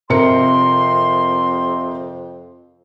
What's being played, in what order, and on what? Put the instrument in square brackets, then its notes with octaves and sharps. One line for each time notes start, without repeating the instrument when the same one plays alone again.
[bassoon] F2 [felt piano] C3 A#4 C#7 [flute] C6